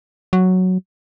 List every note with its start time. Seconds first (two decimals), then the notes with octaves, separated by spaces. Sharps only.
0.33 F#3